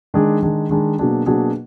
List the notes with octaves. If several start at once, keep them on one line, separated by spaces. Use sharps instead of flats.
D#3 G#3 D4 G#4
D#3 G#3 D4 G#4
D#3 G#3 D4 G#4
B2 F#3 A#3 D4 G#4
B2 F#3 A#3 D4 G#4